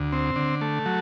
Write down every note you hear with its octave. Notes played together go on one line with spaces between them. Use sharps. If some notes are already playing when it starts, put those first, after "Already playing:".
Already playing: D2
C4
D3
A3
F#3